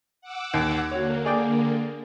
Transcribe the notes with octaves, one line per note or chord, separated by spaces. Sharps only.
F#5 D6 E6
D#2
D3 A#3 F#4 C#5
G#4 D5 G5